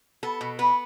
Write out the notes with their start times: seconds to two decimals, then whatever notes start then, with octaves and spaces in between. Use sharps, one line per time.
0.23 B3 A4
0.41 B2
0.59 B3 B4